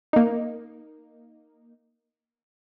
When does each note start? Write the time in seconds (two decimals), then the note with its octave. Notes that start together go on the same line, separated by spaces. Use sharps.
0.13 A#3 D#4